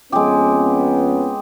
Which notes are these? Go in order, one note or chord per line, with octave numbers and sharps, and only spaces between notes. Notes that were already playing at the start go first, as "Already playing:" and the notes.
F2 G#3 B3 C#4 G4